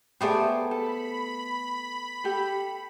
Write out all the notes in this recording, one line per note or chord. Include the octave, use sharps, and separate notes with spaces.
A3 B3 G4 G#4 C5 D5
A4 B5
G4 A4